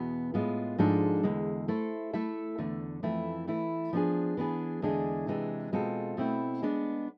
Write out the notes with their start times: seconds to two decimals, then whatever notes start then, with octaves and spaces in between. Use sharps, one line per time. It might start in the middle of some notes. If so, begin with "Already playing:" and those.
Already playing: E2 B2 B3
0.34 A2 G#3 B3 F4 B4
0.78 G#2 F3 G#3 D4 A4
1.23 E2 D3 G#3
1.68 A3 E4 A4 C5
2.13 A3 E4 A4 E5
2.58 E2 D3 A3
3.03 F2 E3 A3 E4
3.47 E3 A3 E4
3.93 F3 B3 D4 G#4
4.37 E3 B3 D4 G#4
4.82 E2 D3 G#3 D4 G#4
5.27 C3 E3 G#3 D4
5.72 B2 G#3 C4 F4 A4
6.17 B2 A3 C4 E4
6.62 G#3 B3 D4